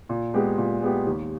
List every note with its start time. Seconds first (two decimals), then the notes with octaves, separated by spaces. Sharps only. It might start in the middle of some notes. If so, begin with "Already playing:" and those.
0.09 A#2
0.34 G#3 B3 G4
0.58 A#2
0.82 G#3 B3 G4
1.07 D#2